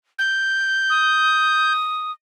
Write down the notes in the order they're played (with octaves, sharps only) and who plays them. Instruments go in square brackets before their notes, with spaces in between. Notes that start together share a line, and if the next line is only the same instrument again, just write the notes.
[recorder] G6
[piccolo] D#6